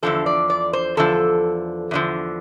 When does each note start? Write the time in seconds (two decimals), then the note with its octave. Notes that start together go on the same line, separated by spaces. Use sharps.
0.03 E2 D3 F3 A4
0.26 D5
0.50 D5
0.73 C5
0.97 E2 D3 F3 A4
1.91 E2 D3 F3